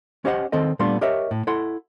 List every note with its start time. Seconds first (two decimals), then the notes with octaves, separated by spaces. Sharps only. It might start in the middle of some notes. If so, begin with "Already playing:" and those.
0.25 C#4 G4 C5 D#5 E5 F#5
0.52 D#3 C4 A4 D#5
0.79 A#2 G3 A3 B3 D4 C6
1.01 G4 A#4 C#5 D#5 E5
1.31 A2
1.47 E4 A4 F#5 C6